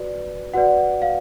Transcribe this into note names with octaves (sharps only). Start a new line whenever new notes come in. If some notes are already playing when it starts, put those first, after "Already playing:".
Already playing: F#4 B4 D5
F#4 B4 D5 F#5
F5